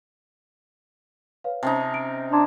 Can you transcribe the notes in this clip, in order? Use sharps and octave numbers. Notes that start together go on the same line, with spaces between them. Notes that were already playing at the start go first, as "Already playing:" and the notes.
B4 C#5 F5
C3 C#4 D#4 A5
D7
D4 A#5 C6 G#6